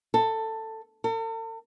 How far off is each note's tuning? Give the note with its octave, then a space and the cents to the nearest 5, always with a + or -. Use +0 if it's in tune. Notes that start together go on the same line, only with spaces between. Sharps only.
A4 +15
A4 +45